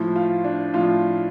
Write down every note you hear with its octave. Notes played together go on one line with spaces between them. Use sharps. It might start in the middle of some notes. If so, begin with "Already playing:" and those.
Already playing: A2 F3
F4
D4
A2 F3 F4